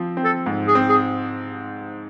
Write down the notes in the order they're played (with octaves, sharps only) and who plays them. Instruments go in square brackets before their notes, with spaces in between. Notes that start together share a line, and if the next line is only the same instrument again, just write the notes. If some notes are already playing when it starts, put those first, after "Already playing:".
Already playing: [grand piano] F3 C4
C4
[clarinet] A4
[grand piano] G#2
[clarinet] G#4
[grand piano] C4
[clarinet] G#4